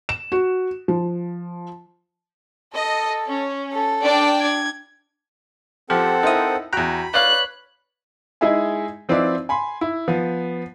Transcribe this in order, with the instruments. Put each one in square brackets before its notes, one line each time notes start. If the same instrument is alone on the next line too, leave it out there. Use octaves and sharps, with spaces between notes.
[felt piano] E7
F#4
F3
[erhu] A4 [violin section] D#5
[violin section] C#4
[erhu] A4
[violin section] D4 D5 G5
[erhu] G#6
[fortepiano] F3 [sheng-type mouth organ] C4 A4 F#5 [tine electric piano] G4
[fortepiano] D#4 E4 [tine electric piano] A#4 C5 D#6
[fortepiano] E2 F#6 [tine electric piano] F#4 G5 A#5 [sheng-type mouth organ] B5
[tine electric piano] B4 C#5 [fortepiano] D5 F5 [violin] F#6
[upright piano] G#3 D#4 E4 G#4 E5 G#5
F3 C4 D#4 E4 B4 D5
G#5 B5 C6
E4
F3 B3